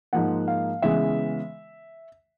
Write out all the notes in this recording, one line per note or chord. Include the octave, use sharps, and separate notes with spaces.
G#2 F3 A#3 F#5
F5
C#3 E3 G#3 B3 E5